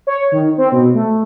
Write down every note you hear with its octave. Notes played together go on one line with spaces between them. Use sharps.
C#5
D#3
C4
B2
A3